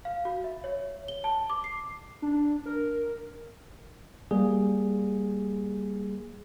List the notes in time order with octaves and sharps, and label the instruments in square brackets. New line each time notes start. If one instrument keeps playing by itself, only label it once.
[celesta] F5
F#4
E5
C#5
G7
A5
D6
C7
[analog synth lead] D4
A#4
[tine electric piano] G3 A#3 G#4